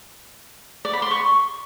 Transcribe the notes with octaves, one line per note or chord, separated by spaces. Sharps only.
D5
B5
C6
C#6